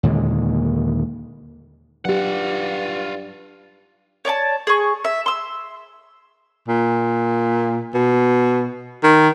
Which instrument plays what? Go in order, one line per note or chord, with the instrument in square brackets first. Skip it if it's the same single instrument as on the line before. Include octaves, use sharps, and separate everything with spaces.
[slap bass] D#2 A#2 D3 G#3
[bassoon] G2 [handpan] F#3 G4 [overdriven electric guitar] F4 F#5
[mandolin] C#5 D5 G#5 A5
G#4 C#6
E5
C6 E6
[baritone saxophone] A#2
B2
D#3